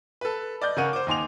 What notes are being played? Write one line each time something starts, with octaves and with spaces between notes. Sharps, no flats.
A4 B4
D5 D#5 G6
C#3 G#4 A#4 F#5 C#6 D#7
C5 D6
D#2 D#4 G#5 C6 D6 F7